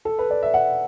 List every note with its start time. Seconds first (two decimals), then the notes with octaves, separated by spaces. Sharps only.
0.05 A4
0.19 B4
0.30 D5
0.43 E5
0.54 F#5